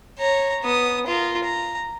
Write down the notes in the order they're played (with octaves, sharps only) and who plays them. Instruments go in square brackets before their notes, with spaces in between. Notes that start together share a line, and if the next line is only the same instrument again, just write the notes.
[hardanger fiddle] C#5 A#5
B3 D#6
F4 A#4
A#5